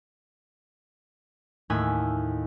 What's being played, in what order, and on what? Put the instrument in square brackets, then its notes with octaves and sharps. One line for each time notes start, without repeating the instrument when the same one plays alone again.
[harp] D#2 A2 A3 G#5 E6 F#6